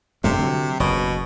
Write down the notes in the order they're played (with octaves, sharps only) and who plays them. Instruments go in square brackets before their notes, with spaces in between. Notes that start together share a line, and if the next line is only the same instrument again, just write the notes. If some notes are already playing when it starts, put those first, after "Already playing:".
[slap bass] E1 G2 A3 [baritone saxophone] C3
[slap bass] D3 D#3 F#3
[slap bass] F#1 E2 [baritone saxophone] B2